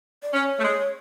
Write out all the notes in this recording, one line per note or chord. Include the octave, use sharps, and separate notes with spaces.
D5
C#4 C#5
A3
G#3